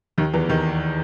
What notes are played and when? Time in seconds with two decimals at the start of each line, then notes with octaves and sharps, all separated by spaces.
0.18 D#2 D#3
0.34 E2 E3
0.49 D#2 D#3